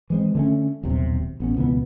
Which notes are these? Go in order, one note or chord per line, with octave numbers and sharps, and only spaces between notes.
E3 G#3 C4
D3 A3 C#4
D#1 B1 C3
A1 B3 C#4
C#2 B2 E3 B3